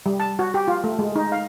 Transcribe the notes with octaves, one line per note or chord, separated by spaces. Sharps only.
G3
A5
F#4
G4
F4
A3
G#3
D#4
F5